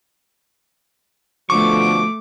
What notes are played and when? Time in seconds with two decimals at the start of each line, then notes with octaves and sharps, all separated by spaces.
1.50 B2 D3 F3 A3 C#6 D6